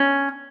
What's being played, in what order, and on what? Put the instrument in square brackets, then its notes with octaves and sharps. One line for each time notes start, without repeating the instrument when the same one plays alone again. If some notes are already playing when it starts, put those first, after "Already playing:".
Already playing: [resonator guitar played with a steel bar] C#4